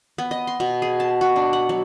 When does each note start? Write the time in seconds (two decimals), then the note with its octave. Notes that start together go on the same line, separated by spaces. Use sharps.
0.18 B3
0.31 D#5
0.47 C6
0.60 B2
0.82 G#4
1.00 A5
1.21 F#4
1.36 D4
1.53 F#5
1.69 F#3